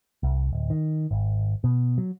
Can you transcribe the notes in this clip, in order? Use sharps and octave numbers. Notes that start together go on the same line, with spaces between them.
C2
D1
D#3
G#1
B2
F#3